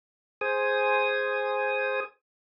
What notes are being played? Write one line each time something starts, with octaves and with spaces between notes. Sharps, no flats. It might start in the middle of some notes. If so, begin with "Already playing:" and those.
G#4 C5 G#5 D#6